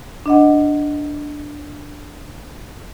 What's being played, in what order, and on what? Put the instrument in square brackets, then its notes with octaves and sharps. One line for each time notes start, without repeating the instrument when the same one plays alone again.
[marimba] D4 D#5 F#5